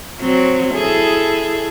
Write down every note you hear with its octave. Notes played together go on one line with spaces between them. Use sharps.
F#3 C4
E4 G#4 A4